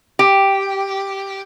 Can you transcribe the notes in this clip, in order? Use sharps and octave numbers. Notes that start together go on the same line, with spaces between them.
G4